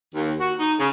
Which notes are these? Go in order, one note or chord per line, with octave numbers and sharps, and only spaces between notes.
D#2
F#4
D#4
C#3